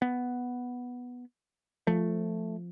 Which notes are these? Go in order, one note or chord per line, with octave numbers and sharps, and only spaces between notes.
B3
F3 A3